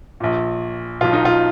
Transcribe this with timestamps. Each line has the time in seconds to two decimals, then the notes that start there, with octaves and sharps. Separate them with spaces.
0.20 A#1 A#2
1.01 B1 B2 F4
1.13 D#4
1.25 F4